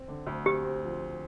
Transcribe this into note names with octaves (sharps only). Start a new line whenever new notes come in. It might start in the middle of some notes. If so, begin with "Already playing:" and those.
Already playing: C4
D3
D2
C4 G4
C4
F3